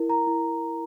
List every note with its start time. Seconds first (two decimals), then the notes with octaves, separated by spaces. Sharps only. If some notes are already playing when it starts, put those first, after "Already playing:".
Already playing: E4 A#4
0.09 A#5
0.27 E4